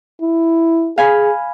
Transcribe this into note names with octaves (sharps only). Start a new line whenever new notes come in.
E4
G#4 F5 G#5 B5